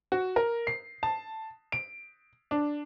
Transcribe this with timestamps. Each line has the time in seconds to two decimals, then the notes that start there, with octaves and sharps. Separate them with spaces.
0.12 F#4
0.36 A#4
0.67 C7
1.03 A5
1.72 D7
2.51 D4